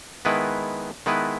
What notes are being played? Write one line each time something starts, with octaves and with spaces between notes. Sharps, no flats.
D#3 G#3 B3 E4 B4
D#3 G#3 B3 E4 B4